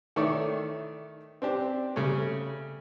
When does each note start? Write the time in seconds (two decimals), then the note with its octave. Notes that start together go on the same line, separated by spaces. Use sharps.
0.16 D#3 A3 E4 C#5 D5
1.42 C4 D4 G4
1.96 C#3 G3 A3 C#4